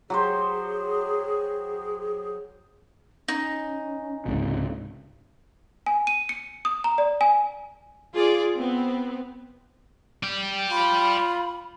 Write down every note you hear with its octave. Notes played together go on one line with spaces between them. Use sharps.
F#3 G4 G#4 C5
C#4 D#4
C#2 G#2 C3
G#5
D#7
C#7
D#6
A#5
D5
G#5
F4 G#4 D5
B3 C4
D5 G5
F4 B5